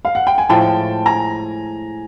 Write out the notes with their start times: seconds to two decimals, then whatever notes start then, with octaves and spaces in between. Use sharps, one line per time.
0.05 F5
0.15 F#5
0.27 G5
0.38 G#5
0.49 A2 F3 G#3 G5 A5
1.06 G#5 A#5